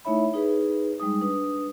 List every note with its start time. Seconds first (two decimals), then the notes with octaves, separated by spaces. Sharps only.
0.05 A3 D#4 E4 C#5 E5 B5
0.34 D#4 G#4 B4
1.00 G3 G#3 D#4 D#6
1.21 D4 B4 D#6